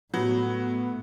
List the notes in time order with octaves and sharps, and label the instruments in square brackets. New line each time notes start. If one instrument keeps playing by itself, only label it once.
[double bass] A2 [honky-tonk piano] F#3 [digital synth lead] B3